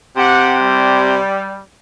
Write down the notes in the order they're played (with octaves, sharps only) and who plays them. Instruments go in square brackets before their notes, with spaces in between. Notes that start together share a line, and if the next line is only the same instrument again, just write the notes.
[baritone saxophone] C3 [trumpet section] G4 F#5
[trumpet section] G3